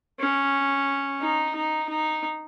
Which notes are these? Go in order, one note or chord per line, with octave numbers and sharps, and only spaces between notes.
C#4
D#4
D#4
D#4